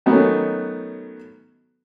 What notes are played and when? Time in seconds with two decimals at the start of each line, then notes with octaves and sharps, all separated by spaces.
0.06 D#3 F#3 A3 B3 C#4